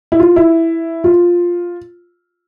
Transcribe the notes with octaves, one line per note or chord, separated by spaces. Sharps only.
E4
F4
E4
F4